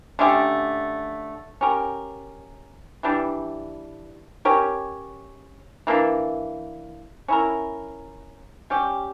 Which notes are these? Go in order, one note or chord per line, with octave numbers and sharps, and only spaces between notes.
D3 A3 C#4 G4
C#4 G4 A#4
E3 G3 D4
C#4 G4 A#4 C#5
E3 A#3 D4
C#4 E4 A#4
G3 C#4 G4